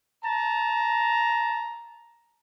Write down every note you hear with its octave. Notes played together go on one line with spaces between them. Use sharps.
A5 A#5